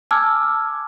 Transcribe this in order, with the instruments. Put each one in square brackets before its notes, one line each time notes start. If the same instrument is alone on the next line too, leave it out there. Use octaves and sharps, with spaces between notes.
[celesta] G#5 A5 D6 E6 F6 G#6